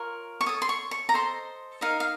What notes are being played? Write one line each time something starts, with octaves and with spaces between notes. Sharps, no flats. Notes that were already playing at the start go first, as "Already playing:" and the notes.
Already playing: F4 A#4 C#5
C#6
A4 C#5 D#6
C6
C#6
C#6
A#5
A4 C5 D#5 C6
D#4 A#4 D#5 F5
F5